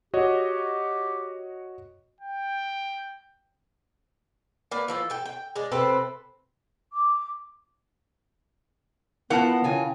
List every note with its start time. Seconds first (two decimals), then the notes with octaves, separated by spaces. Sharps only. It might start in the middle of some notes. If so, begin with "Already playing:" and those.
0.14 F#4 G4 C#5 D#5
2.21 G5
4.71 A#3 B4 D5
4.88 E3 F3 A4
5.10 A4 G5
5.26 G5
5.56 G#3 D4
5.71 C3 C4 A4 B4
6.93 D6
9.30 E3 B3 E4 F4 A#4 F#5 A5
9.64 C#3 F4 G5 G#5